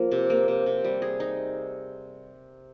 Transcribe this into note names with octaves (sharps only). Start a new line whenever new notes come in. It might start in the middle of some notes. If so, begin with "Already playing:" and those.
Already playing: F3 A#3
C3
A#3
C3
C3
G3
G#4
D#4